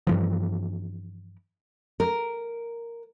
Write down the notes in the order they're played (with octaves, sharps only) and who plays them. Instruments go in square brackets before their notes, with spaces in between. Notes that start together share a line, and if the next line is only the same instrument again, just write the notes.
[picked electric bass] G2 E3 F3
[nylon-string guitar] A#4